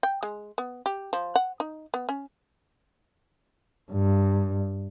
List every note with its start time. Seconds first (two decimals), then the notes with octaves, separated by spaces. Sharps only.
0.03 G5
0.23 G#3
0.58 B3
0.86 G4
1.13 F3
1.35 F#5
1.60 D#4
1.94 B3
2.09 C#4
3.92 G2